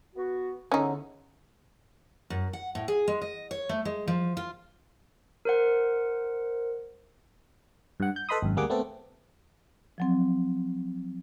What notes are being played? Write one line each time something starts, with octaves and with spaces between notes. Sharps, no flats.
B3 F#4
E2 D3 C#4 D#4
F#2
F#5
A2
G#4
G#3
D#5
C#5
A3
G#3
F3
F4
A#4 C5 F#5
G2 F#5
G6
A4 B4 D#5 B5 C6 D#6
G#1 F#2
D2 G3 A#3 G#4 F#5 D6
A3 B3 C4 A4
F3 F#3 C4